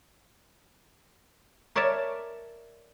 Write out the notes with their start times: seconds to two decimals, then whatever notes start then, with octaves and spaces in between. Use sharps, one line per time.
1.75 A#4 C#5 D5 E5 A5